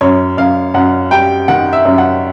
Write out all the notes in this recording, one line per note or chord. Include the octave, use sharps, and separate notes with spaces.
F#2 C#5
F#2 F5
F#2 F#5
G3 G5
D#3 F#5
E5
F#2
F#5